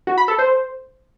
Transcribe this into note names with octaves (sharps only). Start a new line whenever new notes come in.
F#4
B5
A4
C5